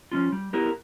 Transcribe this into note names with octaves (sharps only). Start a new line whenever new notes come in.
F3 G#3 C#4 F4
G3
B3 E4 G4 A#4